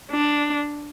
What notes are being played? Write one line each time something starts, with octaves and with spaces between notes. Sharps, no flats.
D4